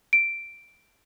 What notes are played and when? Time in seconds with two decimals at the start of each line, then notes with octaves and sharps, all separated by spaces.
0.13 D7